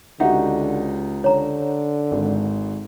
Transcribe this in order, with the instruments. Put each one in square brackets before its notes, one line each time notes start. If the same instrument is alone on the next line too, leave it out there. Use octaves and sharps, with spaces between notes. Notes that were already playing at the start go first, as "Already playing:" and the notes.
[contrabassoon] C#2 [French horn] D3 [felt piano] D#4 F#4 G4 [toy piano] E5 F#5
[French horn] D3 [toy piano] C#5 A#5
[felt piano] G#1 [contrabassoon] G#2